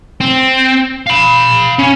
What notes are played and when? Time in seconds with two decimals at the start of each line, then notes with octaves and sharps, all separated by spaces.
0.21 C4
1.07 F5 B5
1.79 C#4